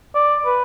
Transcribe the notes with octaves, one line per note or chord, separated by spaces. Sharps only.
D5
B4